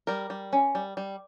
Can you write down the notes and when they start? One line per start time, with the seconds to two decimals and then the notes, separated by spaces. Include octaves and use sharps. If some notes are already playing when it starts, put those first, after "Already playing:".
0.07 G3 A#4
0.30 G3
0.53 C#4
0.75 G3
0.97 G3